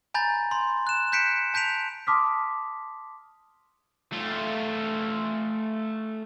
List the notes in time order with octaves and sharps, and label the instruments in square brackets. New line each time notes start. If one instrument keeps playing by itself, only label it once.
[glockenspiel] G#5 A#5 B5 G6 A6
B5 C6
F#6 E7
F#6 G6 B6 C#7 D7 E7
A5 G6 B6 D7 F7
[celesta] A5 C6 D6 D#6 F6 B6
[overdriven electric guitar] A3 F4